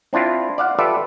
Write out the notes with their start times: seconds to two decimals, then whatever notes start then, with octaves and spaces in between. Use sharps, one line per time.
0.13 C4 D4 E4 F4
0.58 D5 F5 F#5
0.78 F4 G4 A4 B4 D5 E5